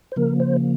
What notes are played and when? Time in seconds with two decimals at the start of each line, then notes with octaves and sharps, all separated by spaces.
0.12 C5
0.16 C#3 F3 A#3 A#4
0.40 C5